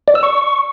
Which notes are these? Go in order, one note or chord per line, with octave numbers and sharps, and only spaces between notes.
D5
E6
C#6